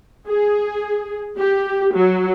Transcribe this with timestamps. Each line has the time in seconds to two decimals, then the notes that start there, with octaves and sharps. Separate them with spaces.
0.27 G#4
1.38 G4
1.94 F#3